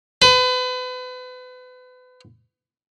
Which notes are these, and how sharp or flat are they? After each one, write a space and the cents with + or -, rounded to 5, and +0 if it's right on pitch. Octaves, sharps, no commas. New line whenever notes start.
B4 +35